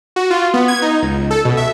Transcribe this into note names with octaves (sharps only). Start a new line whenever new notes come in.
F#4
F4
B3
G#6
D#4
C#2
A4
B2
E5